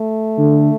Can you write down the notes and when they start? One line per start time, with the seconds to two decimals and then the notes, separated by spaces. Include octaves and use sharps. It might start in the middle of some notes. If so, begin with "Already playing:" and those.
Already playing: A3
0.38 D3